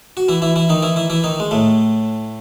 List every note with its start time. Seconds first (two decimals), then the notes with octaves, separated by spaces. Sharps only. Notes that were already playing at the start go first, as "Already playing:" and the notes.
0.17 F#4
0.28 E3 E4
0.42 E3 E4
0.56 E3 E4
0.69 D#3 D#4
0.82 E3 E4
0.96 E3 E4
1.10 E3 E4
1.24 D#3 D#4
1.40 G#3
1.51 A2 A3